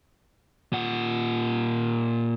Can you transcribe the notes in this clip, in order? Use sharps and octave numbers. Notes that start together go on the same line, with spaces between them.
A#2 F#5